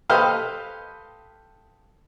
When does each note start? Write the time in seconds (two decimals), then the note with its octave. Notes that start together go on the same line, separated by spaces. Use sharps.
0.10 G4 A4 B4 C5 D#5 F5